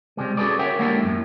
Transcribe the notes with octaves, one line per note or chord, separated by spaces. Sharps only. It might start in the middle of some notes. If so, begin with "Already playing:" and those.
C3 G3 G#3
C#4 F#4 G#4 A4 B4 D5
A#4 C#5 E5 F#5 G5
G#3 A#3 D4 E4 G4 A4
F#2 A2